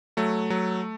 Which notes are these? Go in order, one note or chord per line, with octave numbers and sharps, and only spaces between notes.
F#3 A3
F#3